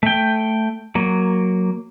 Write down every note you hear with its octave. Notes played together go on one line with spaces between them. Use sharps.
A3 G5
F#3 A#3